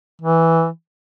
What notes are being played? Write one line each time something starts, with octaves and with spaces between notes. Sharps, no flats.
E3